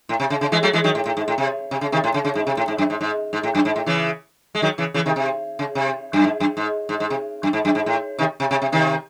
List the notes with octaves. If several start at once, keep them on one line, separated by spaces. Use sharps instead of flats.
A2
C3
C#3
C#3
E3 G#3
F#3 A3
E3 G#3
D#3 F#3
A2
A2
G#2
A2
C3
C3
C#3
C3 D#3
A2
C#3
C#3
G#2
C3
A2
G#2
F#2
G#2
G#2
G#2
A2
F#2
G#2
A2
C#3 E3
G#3
D#3 F#3
C#3 E3
C#3 E3
C3 D#3
C3
C#3
C3
F#2
G#2
F#2
G#2
G#2
G#2
C3
F#2
G#2
F#2
G#2
A2
C3 D#3
C3
C3
C3
C3 D#3